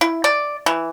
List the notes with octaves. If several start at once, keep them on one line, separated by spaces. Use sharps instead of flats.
E4
D5
E3